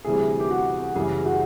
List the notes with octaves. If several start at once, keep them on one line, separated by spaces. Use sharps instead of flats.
D2 C3 E3 G3 G#4
G4
F#4
F#2 C#3 E3 G3 G#4
F#4